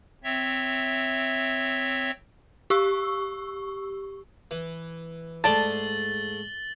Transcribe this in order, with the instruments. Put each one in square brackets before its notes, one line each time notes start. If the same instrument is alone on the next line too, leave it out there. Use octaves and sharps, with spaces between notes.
[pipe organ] C4 C#5 E5
[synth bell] G4 C#6 E6
[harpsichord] E3
[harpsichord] G#2 G#3 A3 [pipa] D5 A5 [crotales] A6 F#7 G7